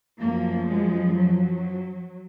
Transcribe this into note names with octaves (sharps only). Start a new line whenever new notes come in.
F#2 F3 A#3
G#3
F#3